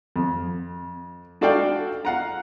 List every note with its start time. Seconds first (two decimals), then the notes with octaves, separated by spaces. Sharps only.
0.16 F2
1.41 D4 F#4 A4 D5 F5 G5
2.05 F5 F#5 A#5